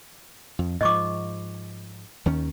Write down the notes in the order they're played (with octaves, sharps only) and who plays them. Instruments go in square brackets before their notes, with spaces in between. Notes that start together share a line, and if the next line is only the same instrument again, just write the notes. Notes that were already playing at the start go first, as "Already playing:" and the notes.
[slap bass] F2
[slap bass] G#2 F3 [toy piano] D#5 C#6 D6
[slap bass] D#2 D#3 C#4